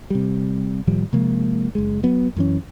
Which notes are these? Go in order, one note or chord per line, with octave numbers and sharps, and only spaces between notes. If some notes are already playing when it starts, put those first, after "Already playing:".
C3 G3
A2 D#3 F3 G3
C3 F3 G#3 A#3
F#1 G#3
F#3 B3
F#2 E3 C#4